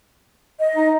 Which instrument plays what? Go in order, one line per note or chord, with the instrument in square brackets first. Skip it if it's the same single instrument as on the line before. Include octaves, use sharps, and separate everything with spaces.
[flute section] D#5
[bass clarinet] D#4